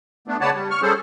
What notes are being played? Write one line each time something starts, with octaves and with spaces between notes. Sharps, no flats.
A3 B3 D4
C#3 B4 C#5 D5 F#5 A5
G3
C#6 F6
G3 C#4 G#4 A4 C5